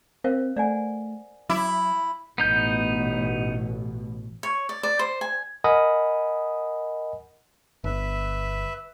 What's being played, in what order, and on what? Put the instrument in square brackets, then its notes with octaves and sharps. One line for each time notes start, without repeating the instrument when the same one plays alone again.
[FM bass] C4 [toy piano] A#4 C5 F5
[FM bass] A3 [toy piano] D5 F#5 G#5
[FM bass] F#3 [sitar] E4 [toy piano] D6
[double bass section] A1 B2 [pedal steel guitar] B3 D#4 G6
[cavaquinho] C#5
D5
D5
C5
G#5
[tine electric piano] A#4 D#5 F#5 G#5 B5 D#6
[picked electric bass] G1 [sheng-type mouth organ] B4 E5